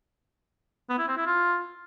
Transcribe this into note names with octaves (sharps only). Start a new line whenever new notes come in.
B3
E4
C4
E4
F4